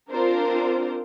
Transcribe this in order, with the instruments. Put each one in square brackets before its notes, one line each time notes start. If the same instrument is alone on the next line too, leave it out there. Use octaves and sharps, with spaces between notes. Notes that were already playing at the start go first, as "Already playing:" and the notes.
[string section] C4 D4 F4 A#4 C5